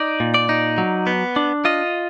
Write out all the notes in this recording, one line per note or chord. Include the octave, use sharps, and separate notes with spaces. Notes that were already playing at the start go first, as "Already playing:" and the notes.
Already playing: D#4 D5
A#2
D5
D#4
F#3
B3
D4
F4 D#5